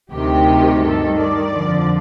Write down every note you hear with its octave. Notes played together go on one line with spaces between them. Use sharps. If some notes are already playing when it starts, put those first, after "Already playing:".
D2 C3 D#3 G4
G2 D#3 A4
D5
F2 D3 F3